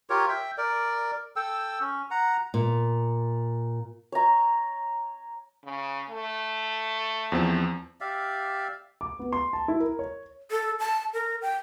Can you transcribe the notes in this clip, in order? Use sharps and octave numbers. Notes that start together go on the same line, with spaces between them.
F4 G4 A#4 C#5
E5 G5
A#4 D5
A4 G5 E6
C#4
F#5 A#5
A#2
C#5 A#5
C#3
A3
E2 F3 C4
G4 D5 E5 F5
D6
B3
C6
A5
E4
A#4
C#5
A4
A5
A#4
G5